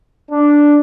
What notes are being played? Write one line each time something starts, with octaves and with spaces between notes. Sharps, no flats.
D4